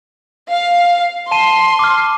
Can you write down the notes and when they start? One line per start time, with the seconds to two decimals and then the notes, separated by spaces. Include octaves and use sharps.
0.50 F5
1.31 A5 C6 D#7
1.79 D6 F6